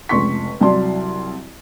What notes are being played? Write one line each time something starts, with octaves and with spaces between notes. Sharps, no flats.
F1 C#2 C6 C#6 B6
C2 F#3 D5 A5 C6